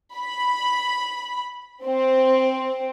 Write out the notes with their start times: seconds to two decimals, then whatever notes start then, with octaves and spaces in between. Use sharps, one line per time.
0.16 B5
1.84 C4